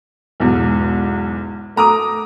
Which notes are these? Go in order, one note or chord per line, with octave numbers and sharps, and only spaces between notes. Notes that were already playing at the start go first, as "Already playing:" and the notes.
B1 E2 G#2
A3 A#5 D6 D#6